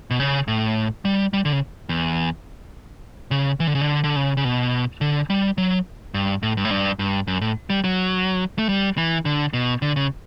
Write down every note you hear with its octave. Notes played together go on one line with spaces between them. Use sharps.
B2
C#3
A2
G3
G3
D3
C#3
E2
C#3
E3
D3
C#3
D3
D3
C#3
C#3
B2
D3
G3
F#3
G2
A2
G2
A2
G2
G2
F#2
A2
G3
F#3
A3
G3
E3
D3
B2
D3
C#3